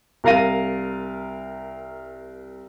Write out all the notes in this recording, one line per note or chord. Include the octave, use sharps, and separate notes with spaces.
C2 A#4 F5 A#6 D#7